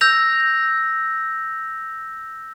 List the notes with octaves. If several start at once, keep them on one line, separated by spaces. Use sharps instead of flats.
E6 G6 A#6 F7